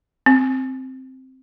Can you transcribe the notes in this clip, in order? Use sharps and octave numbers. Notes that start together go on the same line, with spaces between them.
C4